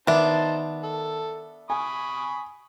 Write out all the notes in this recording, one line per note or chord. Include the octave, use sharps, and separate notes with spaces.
D#3 B3 D4 D#4 C5 E5 A5
A4
G#5 B5 C#6 D#6